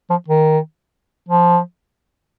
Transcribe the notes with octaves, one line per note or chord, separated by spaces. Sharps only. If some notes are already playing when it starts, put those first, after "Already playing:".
F3
D#3
F3